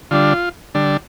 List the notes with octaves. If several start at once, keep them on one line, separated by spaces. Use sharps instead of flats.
D3 G3 D4 F4
D3 G3 D4